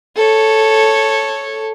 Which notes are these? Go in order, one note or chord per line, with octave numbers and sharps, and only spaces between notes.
A4 C#5